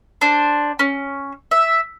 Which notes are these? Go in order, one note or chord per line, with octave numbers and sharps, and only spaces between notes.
D4 C5
C#4
E5